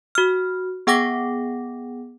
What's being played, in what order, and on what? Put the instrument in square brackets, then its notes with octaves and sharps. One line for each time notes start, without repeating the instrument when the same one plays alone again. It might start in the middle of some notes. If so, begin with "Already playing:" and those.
[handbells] F#4 F6
B3 G#4 F#5 G5 D6 A#6